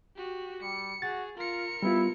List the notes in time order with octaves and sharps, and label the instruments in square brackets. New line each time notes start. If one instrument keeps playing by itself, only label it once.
[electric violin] F#4 G4
[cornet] G3 [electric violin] C#7
[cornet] F#4 [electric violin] G#4 [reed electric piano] A6
[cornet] F4 [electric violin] A#4 C#7
[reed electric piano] G3 B3 F4 [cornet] E4